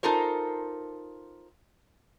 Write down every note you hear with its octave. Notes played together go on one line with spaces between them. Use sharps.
D#4 F4 A4 A#4 C5